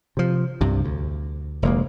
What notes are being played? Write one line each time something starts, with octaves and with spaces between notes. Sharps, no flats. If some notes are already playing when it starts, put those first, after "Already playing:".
C3 F3
C2 G2 C3
D2
F1 D2 G#3 A#3